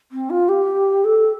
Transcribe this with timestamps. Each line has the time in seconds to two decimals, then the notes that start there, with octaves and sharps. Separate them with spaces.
0.12 C4
0.30 F4
0.49 G4
1.04 A4